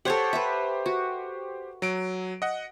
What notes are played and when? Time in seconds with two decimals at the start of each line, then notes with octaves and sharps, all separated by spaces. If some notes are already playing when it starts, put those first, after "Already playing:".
0.05 G4 A4 C5 C#5 F#5
0.33 B4 E5
0.86 F#4
1.82 F#3 D7
2.42 D#5 F#5